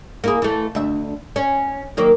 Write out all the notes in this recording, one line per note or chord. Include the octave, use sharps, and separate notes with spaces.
A#3 E4 G#4
E3 A3
D2 E5
C#4
D#3 F#3 A#3